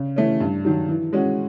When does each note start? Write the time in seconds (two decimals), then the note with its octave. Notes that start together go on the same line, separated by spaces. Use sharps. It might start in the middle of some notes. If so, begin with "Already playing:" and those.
Already playing: C#3
0.16 E3 A3 C#4
0.40 G2
0.65 D#3 F#3
0.88 E3
1.13 G#3 C#4 F#4